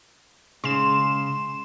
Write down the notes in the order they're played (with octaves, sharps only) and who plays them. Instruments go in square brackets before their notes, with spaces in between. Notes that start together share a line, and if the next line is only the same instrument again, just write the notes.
[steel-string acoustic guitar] C#3 [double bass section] G#3 [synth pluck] C6 E7